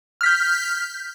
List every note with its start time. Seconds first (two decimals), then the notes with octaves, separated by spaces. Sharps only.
0.21 F6
0.23 B6
0.26 G6